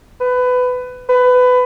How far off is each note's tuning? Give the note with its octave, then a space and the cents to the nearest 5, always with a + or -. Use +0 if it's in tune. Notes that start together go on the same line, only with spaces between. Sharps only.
B4 +20
B4 +20